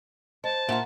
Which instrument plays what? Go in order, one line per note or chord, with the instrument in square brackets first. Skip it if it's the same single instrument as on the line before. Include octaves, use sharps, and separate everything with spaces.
[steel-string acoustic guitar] C5 [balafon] D#5 [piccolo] A5
[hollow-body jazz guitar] A#2 F4 [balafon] E5 F#5 A#5